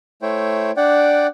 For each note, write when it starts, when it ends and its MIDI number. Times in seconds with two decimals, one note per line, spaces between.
0.22 0.71 57
0.22 0.71 64
0.22 0.71 72
0.22 0.71 73
0.22 0.71 79
0.77 1.27 62
0.77 1.27 74
0.77 1.27 78
0.77 1.27 79